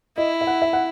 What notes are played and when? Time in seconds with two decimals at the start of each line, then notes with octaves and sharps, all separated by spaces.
0.17 E4 D#5
0.41 E5
0.47 F#5
0.62 E5
0.73 F#5